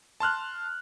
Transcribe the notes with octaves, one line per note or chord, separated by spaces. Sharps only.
A5 C6 F6 F#6